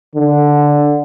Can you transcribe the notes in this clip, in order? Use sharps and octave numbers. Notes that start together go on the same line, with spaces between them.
D3